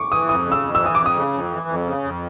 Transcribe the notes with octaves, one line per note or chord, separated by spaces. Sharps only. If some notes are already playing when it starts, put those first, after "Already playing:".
Already playing: C#6 D6
E3 D#6
F2 D#6
C#3
E6
F2
E6
E3
D#6
F2 D6
D#6
C#3
F2
E3
F2
C#3
F2